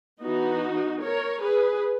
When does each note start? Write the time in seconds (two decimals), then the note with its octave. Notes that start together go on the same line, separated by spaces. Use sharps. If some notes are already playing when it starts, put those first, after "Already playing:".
0.22 E3 B3 D#4 F#4
1.02 A#4 C#5
1.41 G#4 B4